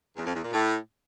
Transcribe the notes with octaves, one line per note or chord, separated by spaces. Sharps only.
E2
F2
E2
A#2
A2